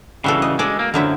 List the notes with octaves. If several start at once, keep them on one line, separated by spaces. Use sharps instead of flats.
C#3 E3 G3 F#4 A4
D#5
G#3 A4 D5
A#3
F#2 D3 F3 F#3 E4